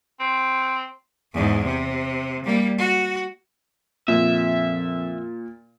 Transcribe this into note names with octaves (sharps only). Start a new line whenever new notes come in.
C4
E2 G#2
C3
G3 A#3
F#4
F2 A#2 E5